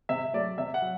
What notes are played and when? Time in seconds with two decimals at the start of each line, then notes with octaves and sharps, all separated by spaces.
0.09 C3 E5
0.33 F#3 A3 D5
0.58 C3 E5
0.74 F#5
0.82 F#3